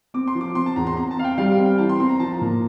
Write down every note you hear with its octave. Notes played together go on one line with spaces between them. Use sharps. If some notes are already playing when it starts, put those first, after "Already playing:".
C4 D6
C6
F3
D6
C4 C6
A5
E2 A#5
C6
C4 A#5
A5
C4 F5
G5
G3 F5
F5
C4
G5
E3 A5
C6
C4 C6
A#5
F3 A5
A#5
A#2